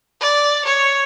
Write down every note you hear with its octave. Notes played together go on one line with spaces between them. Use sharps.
D5
C#5